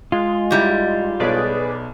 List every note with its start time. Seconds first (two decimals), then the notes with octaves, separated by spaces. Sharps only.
0.12 G#3 F4
0.51 G#2 G3 E4
1.20 B1 G#4 B4 C#5 D5